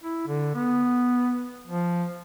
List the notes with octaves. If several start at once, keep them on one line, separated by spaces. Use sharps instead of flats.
E4
D3
B3
F3